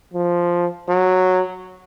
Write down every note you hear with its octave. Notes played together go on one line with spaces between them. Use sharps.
F3
F#3